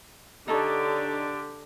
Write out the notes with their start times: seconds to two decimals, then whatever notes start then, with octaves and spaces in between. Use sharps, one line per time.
0.48 D3 D4 D#4 G4 A4 C#5